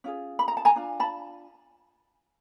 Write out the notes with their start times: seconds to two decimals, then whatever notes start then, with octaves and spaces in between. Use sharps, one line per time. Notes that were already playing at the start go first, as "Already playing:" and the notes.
0.04 C#4 F4 G#4
0.39 B5
0.48 A#5
0.57 A5
0.65 G#5 A#5
0.76 D4 F4
1.00 A5 B5